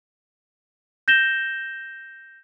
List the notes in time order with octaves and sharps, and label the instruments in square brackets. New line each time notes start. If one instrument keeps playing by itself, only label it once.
[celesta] G6 A#6 E7 G7